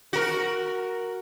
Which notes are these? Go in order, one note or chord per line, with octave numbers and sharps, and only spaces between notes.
F#4 A#4